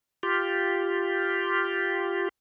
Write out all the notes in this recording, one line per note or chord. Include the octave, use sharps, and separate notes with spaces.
F4 G4